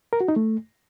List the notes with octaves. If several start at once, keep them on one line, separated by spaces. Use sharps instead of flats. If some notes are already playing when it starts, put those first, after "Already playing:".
A#4
F#4
D#4
A3